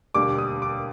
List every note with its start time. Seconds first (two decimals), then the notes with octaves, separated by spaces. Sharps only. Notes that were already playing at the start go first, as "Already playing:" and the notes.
0.14 E1 D#2 D3 G3 D6
0.38 D#6
0.62 D6